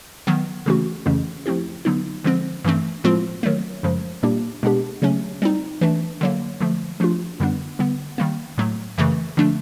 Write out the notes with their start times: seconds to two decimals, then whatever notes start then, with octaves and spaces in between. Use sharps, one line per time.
0.27 D#3 F#3 B3
0.66 C#3 E3 A3 C#4 F#4
1.06 F2 C#3 E3 A3 C#4
1.46 F3 A3 C4 E4 G4
1.85 D3 F#3 B3 D#4
2.24 D3 F3 G#3 C4
2.64 G2 E3 A3 C4
3.04 A2 F3 G#3 C4 F4
3.43 D#3 F#3 A3
3.83 F#2 C#3 F3 G#3
4.23 A#2 G3 A#3 D4 G4
4.63 B2 G#3 B3 D4 G4
5.02 C#3 F#3 A3 C#4
5.42 G3 C4 D#4
5.81 E3 A3 D4
6.21 D3 F#3 A#3
6.61 D3 F3 A3
7.00 F3 A3 D4 F4
7.40 F#2 D3 G3 B3 D4
7.79 D3 G3 B3
8.18 D#3 G3 A#3
8.58 A2 F#3 A3
8.98 F#2 C#3 E3 A3
9.37 D3 F3 A3 D4